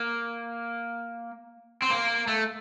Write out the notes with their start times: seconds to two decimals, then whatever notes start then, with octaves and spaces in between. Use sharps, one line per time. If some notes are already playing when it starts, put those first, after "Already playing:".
Already playing: A#3
1.82 C4
1.90 A#3
2.27 A3